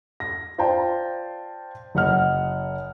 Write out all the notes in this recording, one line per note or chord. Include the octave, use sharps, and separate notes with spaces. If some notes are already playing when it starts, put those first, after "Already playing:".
A#6
F4 C5 D5 G5 A5
F#1 D#5 F#5 F6